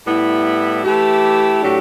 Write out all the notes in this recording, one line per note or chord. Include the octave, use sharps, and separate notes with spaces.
A2 G3 B3 E4
E3 A3 E4 G4
A2 F#3 A3 D4 G4